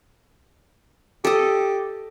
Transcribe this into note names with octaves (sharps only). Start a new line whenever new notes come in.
G4 A4 D#5